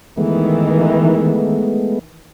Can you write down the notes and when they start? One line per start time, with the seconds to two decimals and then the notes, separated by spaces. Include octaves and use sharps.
0.17 D#3 E3 G#3 A3 B3